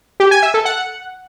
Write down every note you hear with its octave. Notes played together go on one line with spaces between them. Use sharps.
G4
G#5
E5
A4
F#5